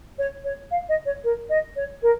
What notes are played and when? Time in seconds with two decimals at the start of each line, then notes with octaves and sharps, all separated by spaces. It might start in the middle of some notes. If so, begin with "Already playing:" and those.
0.18 C#5
0.44 C#5
0.71 F5
0.89 D#5
1.05 C#5
1.24 A#4
1.49 D#5
1.76 C#5
2.02 A#4